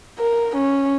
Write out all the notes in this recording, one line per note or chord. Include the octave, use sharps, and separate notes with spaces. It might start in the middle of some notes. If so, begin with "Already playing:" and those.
A#4
C#4